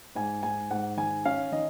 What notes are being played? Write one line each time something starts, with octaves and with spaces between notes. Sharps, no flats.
G#2 G#5
G#2 G#5
G#2 F#5
D#3 G#5
C#4 F5
D#3 D#5